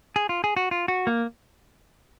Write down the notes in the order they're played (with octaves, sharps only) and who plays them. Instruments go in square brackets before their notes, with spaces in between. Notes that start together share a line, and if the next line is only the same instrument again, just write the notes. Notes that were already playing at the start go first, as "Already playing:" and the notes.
[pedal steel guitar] G#4
F4
G#4
F#4
F4
F#4
A#3